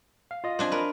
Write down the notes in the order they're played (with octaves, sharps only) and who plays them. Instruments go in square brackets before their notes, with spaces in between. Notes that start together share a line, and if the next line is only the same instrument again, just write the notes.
[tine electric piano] F5
F4 D#5
[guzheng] C4 D4 G#5
A#4 B4